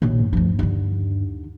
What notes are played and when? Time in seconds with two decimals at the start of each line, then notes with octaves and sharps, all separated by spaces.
0.02 A#1 D#2 B2
0.20 G2
0.33 D2 F3
0.59 D#2 D3